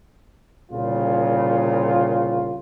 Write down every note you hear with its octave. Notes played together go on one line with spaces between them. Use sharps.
C2 A#2 C#3 F4